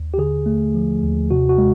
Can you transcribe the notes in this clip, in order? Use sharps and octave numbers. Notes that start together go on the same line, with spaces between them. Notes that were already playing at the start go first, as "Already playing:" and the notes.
Already playing: D#2
G4
D3 G#4
A3
F3
D#2
C3 F#4
F#4
G#3